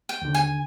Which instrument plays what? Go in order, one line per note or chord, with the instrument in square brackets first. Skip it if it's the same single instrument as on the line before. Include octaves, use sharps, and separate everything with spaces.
[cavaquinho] G5
[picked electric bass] D#2 D3
[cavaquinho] G#5